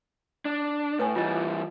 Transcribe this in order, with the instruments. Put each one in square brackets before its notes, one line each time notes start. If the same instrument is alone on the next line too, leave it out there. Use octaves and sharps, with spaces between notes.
[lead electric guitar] D4
[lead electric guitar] A2 [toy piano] B4 C#5 G#5
[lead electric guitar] E3 G3 [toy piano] F4 D#5